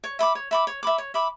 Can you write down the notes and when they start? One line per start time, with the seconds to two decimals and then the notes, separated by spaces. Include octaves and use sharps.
0.04 C#5
0.19 E5 B5 D6
0.35 C#5
0.51 E5 B5 D6
0.67 C#5
0.83 E5 B5 D6
0.98 C#5
1.14 E5 B5 D6